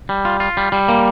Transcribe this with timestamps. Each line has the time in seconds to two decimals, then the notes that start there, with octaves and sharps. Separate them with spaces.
0.09 G3
0.25 F4
0.40 F4
0.57 G3
0.72 G3
0.88 A#3